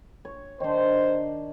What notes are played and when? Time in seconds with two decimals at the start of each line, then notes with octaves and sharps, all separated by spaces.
0.25 C#5
0.60 D#3 D4 C5